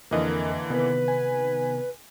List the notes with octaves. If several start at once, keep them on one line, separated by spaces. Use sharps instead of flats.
F2 D3 E3 A#3 A#4 D#5
C3 D#3 B3 B4
G#5